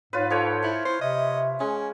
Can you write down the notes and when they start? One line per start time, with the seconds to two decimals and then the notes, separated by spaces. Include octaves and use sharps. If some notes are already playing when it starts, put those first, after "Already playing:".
0.13 G#2 F4 B4 C#5
0.30 F3 A4 C#5 G5
0.63 E4
0.85 E4 C5
1.01 C3 D#5 E5
1.60 G#3 C#4